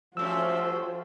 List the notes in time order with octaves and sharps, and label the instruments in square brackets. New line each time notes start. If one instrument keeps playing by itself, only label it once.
[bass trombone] F3 [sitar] G3 A3 C#4 [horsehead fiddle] F#4 C5 [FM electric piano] E6